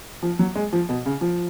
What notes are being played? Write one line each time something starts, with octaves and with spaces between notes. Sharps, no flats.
F3
F#3
G#3
F3
B2
C#3
F3